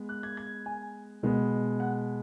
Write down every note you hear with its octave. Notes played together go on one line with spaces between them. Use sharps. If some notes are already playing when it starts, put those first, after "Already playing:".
Already playing: G#3 B3
F#6
G#6
G#6
G#5
B2 G#3 B3
F#5